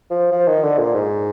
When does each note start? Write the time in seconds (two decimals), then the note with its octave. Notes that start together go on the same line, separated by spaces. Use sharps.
0.10 F3
0.32 F3
0.47 D#3
0.63 D3
0.79 A#2
0.94 G#2